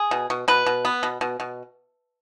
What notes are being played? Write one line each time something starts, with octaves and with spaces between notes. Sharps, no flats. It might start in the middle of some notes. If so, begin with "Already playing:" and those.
Already playing: G#4
B2
B2
B2 B4
B2
B3
B2
B2
B2